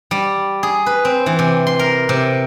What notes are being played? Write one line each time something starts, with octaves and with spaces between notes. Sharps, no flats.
G3
G#4
B4
C4
E3
C3
C6
A#4
C3